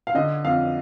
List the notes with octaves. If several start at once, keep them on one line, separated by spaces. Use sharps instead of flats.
F5
D3 D#5
F2 F5